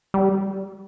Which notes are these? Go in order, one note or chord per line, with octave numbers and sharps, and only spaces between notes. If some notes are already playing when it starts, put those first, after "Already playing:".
G3